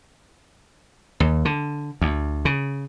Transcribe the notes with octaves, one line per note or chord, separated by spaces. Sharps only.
D#2
D3
D2
C#3